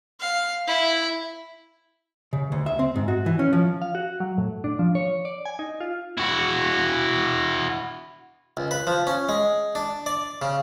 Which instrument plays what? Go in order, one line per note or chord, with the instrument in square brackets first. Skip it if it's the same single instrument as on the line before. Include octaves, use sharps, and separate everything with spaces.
[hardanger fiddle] F5
E4
[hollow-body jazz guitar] C#3
D2
E5
C4
G#2
F#4
E3
C#4
F3
[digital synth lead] F5
F#4
F#3
A2
D4
F3
C#5
D5
G#5
D#4
F4
[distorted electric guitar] E4 F#4
[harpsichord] C#2
B4
F3
C#4
G#3
D4
D5
C#3